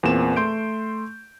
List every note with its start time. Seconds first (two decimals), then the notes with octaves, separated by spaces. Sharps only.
0.03 E2 A#2 C4 E7
0.36 A3 C6 G6 D7